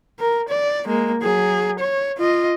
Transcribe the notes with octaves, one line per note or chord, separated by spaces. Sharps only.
A#4
D5
G#3 A#3
F#3 G#4
C#5
F4 D#5